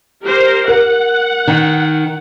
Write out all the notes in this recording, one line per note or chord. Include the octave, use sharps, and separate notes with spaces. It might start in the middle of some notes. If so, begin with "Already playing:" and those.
G4 A#4 C5
A#4 F#5
D#3